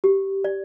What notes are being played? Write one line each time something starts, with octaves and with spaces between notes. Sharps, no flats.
G4
D5